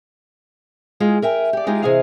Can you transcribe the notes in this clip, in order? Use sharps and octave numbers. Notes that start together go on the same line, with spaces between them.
G#3 F4 G#4
A#4 E5 G5 G#5
G4 D5
G#3 D#4 F4 G4 G#4
C3 E3 G#4 D#5 F5